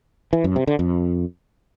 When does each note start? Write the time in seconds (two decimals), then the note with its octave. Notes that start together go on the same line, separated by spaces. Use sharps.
0.33 E3
0.44 F#2
0.56 C3
0.67 D3
0.79 F2